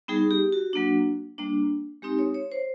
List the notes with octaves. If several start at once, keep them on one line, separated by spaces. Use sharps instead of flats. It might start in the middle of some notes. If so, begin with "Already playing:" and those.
G3 B3 D#4 G#4
G4
F#4
F#3 A#3 D4
G3 A#3 D4
G#3 C4 D#4 G4
C#5
C#5
C5